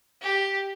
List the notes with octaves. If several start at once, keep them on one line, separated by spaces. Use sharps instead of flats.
G4